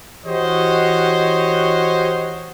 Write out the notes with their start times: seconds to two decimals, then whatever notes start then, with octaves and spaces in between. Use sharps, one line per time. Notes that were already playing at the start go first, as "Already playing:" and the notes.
0.25 E3 F#4 G4 C5 C#5 D#5